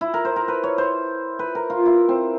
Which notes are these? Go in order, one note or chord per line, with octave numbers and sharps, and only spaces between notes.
E4
A#4
C5
A#4
B4
C#5
C5
B4
A#4
F4
E4
C4